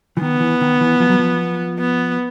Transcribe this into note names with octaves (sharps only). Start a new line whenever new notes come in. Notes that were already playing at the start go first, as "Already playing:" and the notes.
E3
D#3 B3
E3
D#3
E3
F3
F#3
F3
B3